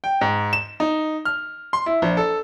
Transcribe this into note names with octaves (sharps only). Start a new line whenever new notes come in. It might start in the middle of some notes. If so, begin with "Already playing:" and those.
G5
G#2
E7
D#4
F6
C6
E4
A#1
A4